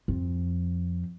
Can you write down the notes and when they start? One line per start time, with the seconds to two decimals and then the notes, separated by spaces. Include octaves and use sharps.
0.08 F2